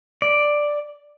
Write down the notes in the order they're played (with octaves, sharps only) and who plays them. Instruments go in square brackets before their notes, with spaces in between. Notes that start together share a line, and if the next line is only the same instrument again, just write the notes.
[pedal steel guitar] D5